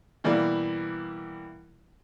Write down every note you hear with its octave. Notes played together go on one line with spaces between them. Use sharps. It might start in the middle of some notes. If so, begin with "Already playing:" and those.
B2 E3 G3 A#3